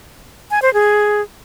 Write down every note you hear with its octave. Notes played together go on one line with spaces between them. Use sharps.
G#5
C5
G#4